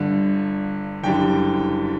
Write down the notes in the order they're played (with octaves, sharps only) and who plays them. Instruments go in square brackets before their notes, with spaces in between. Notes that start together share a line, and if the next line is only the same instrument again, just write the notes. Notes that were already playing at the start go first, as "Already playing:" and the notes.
Already playing: [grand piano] G1 G2 D3
F#1 F#2 D3 G3 G5